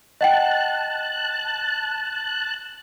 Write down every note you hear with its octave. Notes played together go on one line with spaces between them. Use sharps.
D#5 F#5 G5 A5 F#6